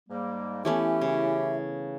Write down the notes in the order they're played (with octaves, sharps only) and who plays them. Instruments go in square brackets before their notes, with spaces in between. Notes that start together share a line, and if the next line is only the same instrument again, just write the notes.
[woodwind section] G#2 G3 A#3
[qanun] E3 A3 B3 [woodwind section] C#4 E4 G4 [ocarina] E5
[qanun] C#3